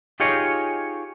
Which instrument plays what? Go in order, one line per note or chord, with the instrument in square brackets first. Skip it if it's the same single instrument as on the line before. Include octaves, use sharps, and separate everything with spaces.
[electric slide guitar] D#4 F4 G4 G#4 C#5 D#5